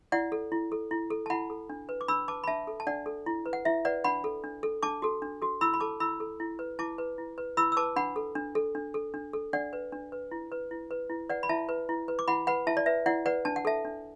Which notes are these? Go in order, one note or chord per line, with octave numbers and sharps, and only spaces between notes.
E4 D5 F#5
A4
E4
A4
E4
A4
A5
E4 F#5 B5
A4
D4
B4
D6
D4 B5 E6
B4 A5 D6
B5
D4 E5 A5
A4
A5
D4 D5 F#5
A4
E4
B4
F#5
E4 E5
B4 D5 F#5
D4 F#5 B5
A4
D4
A4
D4 A5 D6
F#4 A4
D4
F#4 A4
E4 B5 E6
B5
A4 A5 D6
E4 B5 E6
A4
E4
B4
E4 A5 D6
B4
E4
B4
E4 B5 E6
E6
B4 A5 D6
D4 F#5 B5
A4
D4
A4
D4
A4
D4
A4
D4 D5 F#5
B4
D4
B4
E4
B4
E4
B4
E4
B4 D5 F#5
B5
E4 E5 A5
B4
E4
B4
D6
E4 F#5 B5
B4 F#5 B5
E4 E5 A5
D5
B4 E5
E4 D5 F#5
B4 D5 F#5
D4 A5
F#5
A4 E5 A5
D4